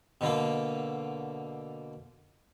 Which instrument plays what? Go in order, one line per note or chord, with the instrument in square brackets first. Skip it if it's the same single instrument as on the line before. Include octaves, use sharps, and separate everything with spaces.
[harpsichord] B2 D3 A#3